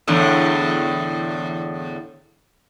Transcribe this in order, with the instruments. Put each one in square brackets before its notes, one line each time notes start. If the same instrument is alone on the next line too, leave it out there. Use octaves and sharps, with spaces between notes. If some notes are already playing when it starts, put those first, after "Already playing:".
[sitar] E2 A2 D3